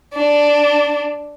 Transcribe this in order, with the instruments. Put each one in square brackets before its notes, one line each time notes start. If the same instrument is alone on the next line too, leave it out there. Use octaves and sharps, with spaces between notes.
[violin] D4